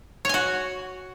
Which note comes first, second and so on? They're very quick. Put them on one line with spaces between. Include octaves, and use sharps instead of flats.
C#5 G#5 F#4